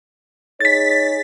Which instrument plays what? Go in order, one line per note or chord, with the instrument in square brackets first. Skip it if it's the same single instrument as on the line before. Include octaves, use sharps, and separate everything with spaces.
[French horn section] D#4 G#4 C#5 [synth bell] A6 B6